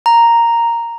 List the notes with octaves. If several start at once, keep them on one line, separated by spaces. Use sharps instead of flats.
A#5